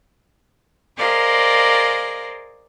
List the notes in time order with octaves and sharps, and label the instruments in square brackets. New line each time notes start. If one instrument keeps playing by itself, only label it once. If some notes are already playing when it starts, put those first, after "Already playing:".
[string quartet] G#4 A#4 C5 D5 D#5 F5